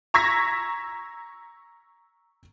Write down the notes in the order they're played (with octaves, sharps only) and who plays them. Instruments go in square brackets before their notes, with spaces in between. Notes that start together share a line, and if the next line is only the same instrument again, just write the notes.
[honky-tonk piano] A#5 C#6 E6 G#6 A#6 B6